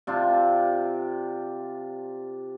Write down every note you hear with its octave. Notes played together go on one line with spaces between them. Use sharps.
C3 D4 F4